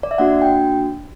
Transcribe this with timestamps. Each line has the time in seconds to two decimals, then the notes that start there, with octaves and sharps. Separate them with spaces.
0.03 D5
0.11 E5
0.18 A#3 D4 F#4 F#5
0.42 G5